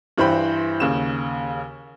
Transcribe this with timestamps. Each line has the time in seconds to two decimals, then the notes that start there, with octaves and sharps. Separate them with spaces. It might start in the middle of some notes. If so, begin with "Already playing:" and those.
0.18 G2 E3 C5 G5 B5
0.80 D#2 C#3 E7